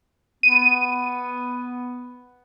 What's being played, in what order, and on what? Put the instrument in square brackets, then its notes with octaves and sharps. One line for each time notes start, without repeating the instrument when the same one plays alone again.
[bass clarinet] B3 [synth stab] D#7